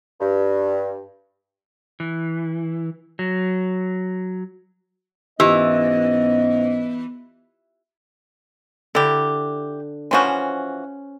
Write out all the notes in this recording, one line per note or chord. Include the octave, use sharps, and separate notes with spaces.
G2
E3
F#3
G#2 E3 B3 C#4 F4 G4 D#5 E6
D3 E4 G4
E3 F3 C#4 F#4 C5